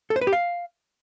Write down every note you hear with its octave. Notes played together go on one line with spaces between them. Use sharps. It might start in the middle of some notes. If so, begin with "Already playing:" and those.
A4
C5
B4
G4
F5